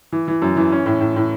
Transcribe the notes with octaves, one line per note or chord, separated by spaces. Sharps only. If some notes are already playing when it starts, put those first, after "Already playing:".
E3
E3
F#2
E3
C#4
A2
A2
A2